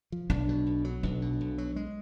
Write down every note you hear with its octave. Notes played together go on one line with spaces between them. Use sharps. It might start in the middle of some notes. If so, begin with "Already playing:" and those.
F3
B1 D4
B2
B1
F#3
B1 D4
B2
B1
F#3
G#3